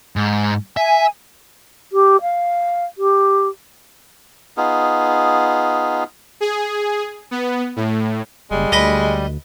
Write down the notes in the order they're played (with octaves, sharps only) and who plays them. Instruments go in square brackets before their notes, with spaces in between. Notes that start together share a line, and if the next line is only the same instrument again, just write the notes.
[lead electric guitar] G#2
[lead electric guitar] E5 [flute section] G#5
[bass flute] G4
F5
G4
[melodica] B3 D#4 F4 G#4
[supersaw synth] G#4
B3
A2
[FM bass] F#1 [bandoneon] G3 [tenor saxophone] G#3
[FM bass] D2 [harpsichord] B4 D#5